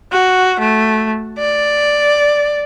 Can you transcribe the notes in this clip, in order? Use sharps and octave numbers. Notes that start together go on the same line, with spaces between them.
F#4
A3
D5